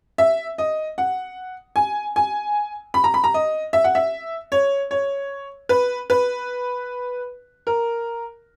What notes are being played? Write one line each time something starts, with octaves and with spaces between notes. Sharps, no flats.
E5
D#5
F#5
G#5
G#5
B5
A#5
B5
A#5
D#5
E5
F#5
E5
C#5
C#5
B4
B4
A#4